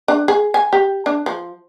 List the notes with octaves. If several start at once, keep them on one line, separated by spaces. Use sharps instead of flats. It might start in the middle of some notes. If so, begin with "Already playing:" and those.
D4
G#4
G#5
G4
D4
F3